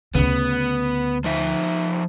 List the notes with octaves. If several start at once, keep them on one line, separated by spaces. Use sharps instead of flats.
D2 C#3 B3
F3 D#4 E5